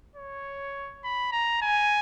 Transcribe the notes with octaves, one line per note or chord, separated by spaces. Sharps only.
C#5
B5
A#5
G#5